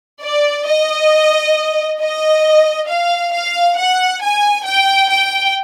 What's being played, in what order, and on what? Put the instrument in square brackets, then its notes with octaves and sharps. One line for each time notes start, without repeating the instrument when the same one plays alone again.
[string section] D5
D#5
D#5
F5
F5
F#5
G#5
G5
G5